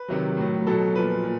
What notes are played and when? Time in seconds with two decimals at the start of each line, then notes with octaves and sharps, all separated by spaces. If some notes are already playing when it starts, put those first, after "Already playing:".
Already playing: B4
0.08 C3 D#3 F#3
0.37 A2 F#3
0.67 B2 F#3 A4
0.95 A#2 F3 B4
1.24 A#2